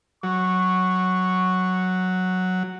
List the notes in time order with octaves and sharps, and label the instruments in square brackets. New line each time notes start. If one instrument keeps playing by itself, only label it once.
[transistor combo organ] F#3 [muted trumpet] C#6